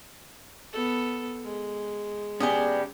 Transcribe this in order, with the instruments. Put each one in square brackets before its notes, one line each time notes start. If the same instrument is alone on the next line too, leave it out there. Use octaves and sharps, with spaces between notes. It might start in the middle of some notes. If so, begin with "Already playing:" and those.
[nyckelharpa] B3 A4
G#3
[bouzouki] B3 D4 G#4 [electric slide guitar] C#4 G4